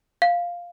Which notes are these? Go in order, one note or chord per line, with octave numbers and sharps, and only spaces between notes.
F5